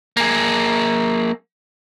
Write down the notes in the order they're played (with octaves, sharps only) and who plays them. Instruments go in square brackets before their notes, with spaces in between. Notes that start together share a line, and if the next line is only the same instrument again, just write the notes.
[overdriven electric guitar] A#3 G#4